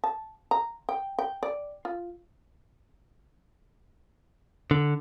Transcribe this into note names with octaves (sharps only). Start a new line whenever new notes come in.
A5
A#5
G5
G5
D5
F4
D3